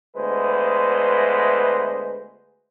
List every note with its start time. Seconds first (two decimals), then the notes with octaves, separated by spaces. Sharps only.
0.16 D2 G#3 B3 B4 C5